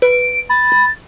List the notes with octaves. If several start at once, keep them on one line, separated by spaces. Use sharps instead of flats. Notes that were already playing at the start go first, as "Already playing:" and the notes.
B4 D7
B5 A6